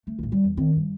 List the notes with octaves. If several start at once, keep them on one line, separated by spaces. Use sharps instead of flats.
A3
A1 D2
G3
E2
D#3 C4
G2